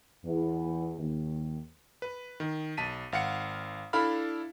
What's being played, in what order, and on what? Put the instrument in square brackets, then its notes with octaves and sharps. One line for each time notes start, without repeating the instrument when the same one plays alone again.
[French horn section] E2
D#2
[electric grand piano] B4
D#3
B1 A5 B6 D#7
G#1 F5 F#5 C#7
D4 E4 A4 F5 B5 F6